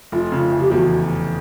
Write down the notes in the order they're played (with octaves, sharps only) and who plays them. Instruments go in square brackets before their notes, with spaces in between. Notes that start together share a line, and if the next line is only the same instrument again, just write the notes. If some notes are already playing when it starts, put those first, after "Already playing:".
[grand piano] F1 [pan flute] F4
[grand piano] C#3
F1
[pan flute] G4
[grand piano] E2 [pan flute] F#4